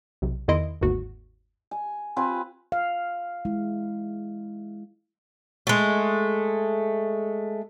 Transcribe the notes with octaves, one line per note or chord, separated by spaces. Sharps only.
B1 C3
E2 D#3 E4 D#5 C6 D7
G1 D#2 G#2 F#4
G#5
C4 F4 B4 G#5
F5
G#3 E4
G#3 A3